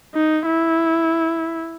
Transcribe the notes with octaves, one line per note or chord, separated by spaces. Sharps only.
D#4
E4